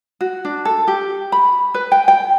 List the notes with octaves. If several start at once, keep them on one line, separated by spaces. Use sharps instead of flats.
F#4
D4
A4
G4
B5
B4
G5
G5